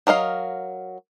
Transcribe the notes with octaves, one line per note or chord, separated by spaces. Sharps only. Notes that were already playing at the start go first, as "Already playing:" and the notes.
F#3 A#4 D#5 F5